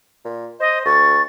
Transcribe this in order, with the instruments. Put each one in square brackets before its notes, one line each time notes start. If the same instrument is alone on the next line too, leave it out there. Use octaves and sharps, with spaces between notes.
[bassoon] A#2
[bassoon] C5 [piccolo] D#5
[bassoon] D2 [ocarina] C#6 [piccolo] A6